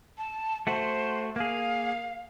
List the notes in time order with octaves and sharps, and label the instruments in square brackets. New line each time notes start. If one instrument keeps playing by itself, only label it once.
[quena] A5
[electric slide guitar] A3 F#4 [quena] C5
[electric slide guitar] A#3 G#4 [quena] F5